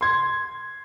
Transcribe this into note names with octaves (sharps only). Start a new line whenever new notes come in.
C6 G#6